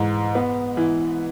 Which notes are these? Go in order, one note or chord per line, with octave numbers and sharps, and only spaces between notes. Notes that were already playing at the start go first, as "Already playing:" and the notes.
Already playing: G#2 E3
B3
E3